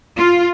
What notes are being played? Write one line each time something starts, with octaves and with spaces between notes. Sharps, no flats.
F4